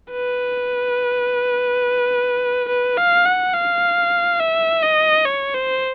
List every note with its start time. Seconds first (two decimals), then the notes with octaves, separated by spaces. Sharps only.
0.12 B4
2.69 B4
2.97 F5
3.25 F#5
3.54 F5
4.40 E5
4.83 D#5
5.25 C#5
5.54 C5